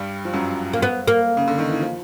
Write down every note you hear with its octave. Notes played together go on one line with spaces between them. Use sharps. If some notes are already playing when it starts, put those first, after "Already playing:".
Already playing: G2 G3
F3
F#2 F#3
A#3
B3
A#3
C#3
D3
D#3
E3
F3